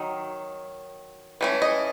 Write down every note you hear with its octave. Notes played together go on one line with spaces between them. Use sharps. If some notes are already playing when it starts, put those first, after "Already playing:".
Already playing: D#3 F#3
E3 A3 C#4
D#5